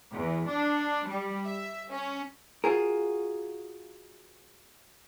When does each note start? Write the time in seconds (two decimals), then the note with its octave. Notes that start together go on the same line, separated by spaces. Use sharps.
0.12 E2
0.47 D4
1.06 G3
1.45 E5
1.92 C#4
2.64 F4 F#4 G#4 A#4